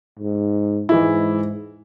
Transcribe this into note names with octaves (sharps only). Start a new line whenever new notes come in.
G#2
G#2 E3 G#3 E4